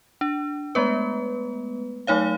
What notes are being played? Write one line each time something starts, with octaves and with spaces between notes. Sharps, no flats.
D4
G#3 A3 B3 B4
F#3 A3 D#4 C#5 F5